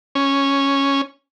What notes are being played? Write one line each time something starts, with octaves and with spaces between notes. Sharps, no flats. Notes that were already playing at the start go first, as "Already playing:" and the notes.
C#4